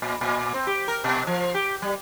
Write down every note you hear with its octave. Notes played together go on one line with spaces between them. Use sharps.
A#2
A#2
C4
G4
A#4
B2
F3
G4
G3